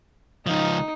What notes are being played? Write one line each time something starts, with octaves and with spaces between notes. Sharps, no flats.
C#2 F3 D#4